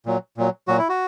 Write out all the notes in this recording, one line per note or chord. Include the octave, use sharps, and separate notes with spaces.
A#2 F#3
A#2 F#3
A#2 F#3 F#4
E4
F#4